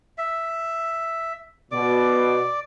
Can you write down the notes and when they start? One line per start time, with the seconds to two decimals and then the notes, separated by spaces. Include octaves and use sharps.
0.18 E5
1.71 B2 D5 D6